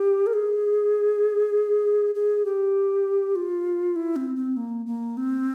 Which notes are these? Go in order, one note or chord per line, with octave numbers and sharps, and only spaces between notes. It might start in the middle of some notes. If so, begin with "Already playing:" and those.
Already playing: G4
A#4
G#4
G#4
G4
F4
E4
C4
C4
A#3
A#3
C4